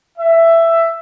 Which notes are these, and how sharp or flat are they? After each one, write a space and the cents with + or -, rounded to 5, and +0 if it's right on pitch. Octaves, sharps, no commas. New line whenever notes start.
E5 +10